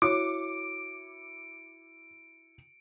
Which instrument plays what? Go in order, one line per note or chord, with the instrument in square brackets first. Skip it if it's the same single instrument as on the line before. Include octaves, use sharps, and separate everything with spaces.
[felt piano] E4 [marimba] F#4 C#5 [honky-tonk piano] D6 [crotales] C#7 D7